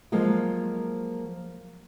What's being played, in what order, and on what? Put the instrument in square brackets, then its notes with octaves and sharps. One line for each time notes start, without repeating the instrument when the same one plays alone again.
[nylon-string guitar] F3 F#3 G#3 A#3